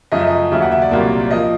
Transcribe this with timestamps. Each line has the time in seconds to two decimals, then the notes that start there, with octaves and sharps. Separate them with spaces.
0.12 F#2 C#3 F3 A3 D#5
0.19 E5
0.27 D#5
0.51 D#2 C#3 F#3 E5
0.62 F#5
0.72 E5
0.82 D5
0.91 C2 A#2 F#3 A#3
1.19 D5
1.31 F3 A#3 D#5